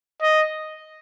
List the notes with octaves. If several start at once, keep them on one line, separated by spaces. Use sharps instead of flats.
D#5